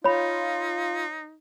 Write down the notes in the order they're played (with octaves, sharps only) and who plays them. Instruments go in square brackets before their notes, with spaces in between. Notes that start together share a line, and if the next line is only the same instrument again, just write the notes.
[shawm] D#4 [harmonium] F4 [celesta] C#5 B5